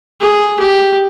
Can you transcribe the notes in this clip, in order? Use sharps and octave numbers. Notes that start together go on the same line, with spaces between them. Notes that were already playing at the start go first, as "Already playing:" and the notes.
G#4
G4